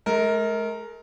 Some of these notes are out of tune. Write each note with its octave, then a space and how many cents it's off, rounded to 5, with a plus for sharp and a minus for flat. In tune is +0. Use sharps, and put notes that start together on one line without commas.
G#3 +45 A#4 -5